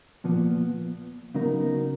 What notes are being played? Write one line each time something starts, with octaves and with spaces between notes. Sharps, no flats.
A#2 F3 B3
C#3 F#3 B3 D#4 A#4